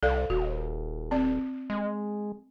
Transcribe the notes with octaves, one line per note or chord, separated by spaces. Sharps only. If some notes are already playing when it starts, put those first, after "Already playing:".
C2 A4 D5 F5
D#1 F#4
C4 D5
G#3